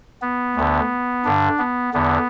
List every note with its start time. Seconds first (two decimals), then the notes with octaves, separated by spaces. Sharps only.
0.22 B3
0.56 D2 D3
1.25 G2 D3 D4
1.59 B3
1.94 E2 D3 B3